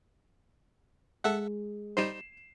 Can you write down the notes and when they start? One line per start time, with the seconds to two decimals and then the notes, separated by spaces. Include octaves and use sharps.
1.24 G#3 A4 E5 F#5
1.97 G3 D#4 C5 C7 E7